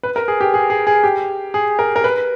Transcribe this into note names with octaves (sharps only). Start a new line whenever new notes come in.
B4
A#4
G#4
G4
G#4
G#4
G#4
G4
G#4
A#4
A#4
B4